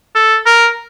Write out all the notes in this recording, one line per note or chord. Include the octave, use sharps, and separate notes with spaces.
A4
A#4